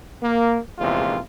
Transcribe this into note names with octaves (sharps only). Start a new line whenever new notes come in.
A#3
A#1 E2 C3 G#3 F4